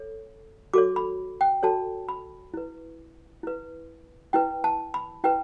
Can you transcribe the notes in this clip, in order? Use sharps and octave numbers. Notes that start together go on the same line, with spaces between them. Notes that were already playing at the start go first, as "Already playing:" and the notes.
Already playing: A4 C#5
F#4 A4 C#5 D6
B5
G5
F#4 A4 C#5 A5
B5
E4 B4
E4 B4
E4 B4 G5
A5
B5
E4 B4 G5